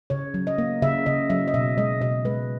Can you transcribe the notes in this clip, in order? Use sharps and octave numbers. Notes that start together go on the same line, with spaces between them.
C#3 C#5
F#3
D#5
A#3
C#3 E5
C#3 D#5
F#3 E5
D#5
B2 E5
G#3 D#5
B2 D#5
G#3 B4